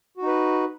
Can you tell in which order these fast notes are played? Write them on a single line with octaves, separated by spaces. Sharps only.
F#4 D#4 B4